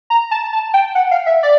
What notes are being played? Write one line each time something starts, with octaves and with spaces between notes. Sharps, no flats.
A#5
A5
A5
G5
F#5
F5
E5
D5